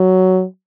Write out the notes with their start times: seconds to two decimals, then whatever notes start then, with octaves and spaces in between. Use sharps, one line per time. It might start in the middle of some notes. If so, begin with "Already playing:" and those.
Already playing: F#3